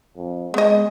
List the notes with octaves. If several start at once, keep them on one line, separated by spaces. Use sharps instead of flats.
F2
G#3 B3 D#5